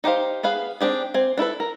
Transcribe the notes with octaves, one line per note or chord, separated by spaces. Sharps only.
D#4 G4 C5 F5
B3 G#4 B4 F5
C4 D4 G4 G#4
C4 G#5
D4 E4 A4 B4
A#4